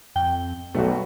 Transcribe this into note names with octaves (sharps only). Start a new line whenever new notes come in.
F2 G5
B1 G3 A3 F#4